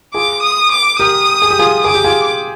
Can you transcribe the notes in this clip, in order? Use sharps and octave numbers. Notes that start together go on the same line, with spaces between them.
F4 G#4 D6
D#6
D6
G4 A#4 D#6
G#4
G4
F4 G#4
G#4 D6
G4
F4 G#4